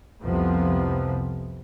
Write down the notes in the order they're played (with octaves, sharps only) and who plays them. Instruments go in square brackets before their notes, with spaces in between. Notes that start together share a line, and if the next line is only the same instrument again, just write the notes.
[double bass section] C2 F2 C3 F3 B3